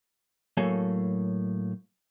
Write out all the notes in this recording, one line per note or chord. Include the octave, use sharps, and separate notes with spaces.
A2 F#3 A#3 A4 C#5 G#5